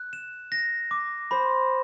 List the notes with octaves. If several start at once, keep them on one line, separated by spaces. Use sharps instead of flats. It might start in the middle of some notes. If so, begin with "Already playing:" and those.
Already playing: F#6
E7
A#6
D6
C5 B5